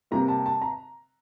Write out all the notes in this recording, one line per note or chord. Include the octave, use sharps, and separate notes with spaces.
C3 G3 A#3 A#5
A5
A5
A#5